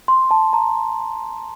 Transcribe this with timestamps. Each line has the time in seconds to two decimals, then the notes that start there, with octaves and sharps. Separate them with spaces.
0.08 C6
0.31 A5
0.53 A#5